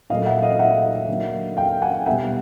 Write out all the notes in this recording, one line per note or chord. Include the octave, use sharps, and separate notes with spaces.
A#2 F#3 A3 D#5 F5
E5 F#5
D#5 F5
E5 F#5
D3 F#3 A#3
F5 G5
F#5 G#5
B2 G3 B3 E5 F#5